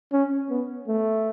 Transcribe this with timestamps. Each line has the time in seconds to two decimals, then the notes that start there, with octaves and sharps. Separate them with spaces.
0.12 C#4
0.50 B3
0.88 A3